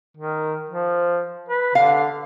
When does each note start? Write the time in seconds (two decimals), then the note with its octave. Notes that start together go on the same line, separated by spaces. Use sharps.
0.17 D#3
0.69 F3
1.49 B4
1.75 D3 F5